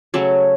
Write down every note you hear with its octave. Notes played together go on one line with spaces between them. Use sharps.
C#3 F#3 A3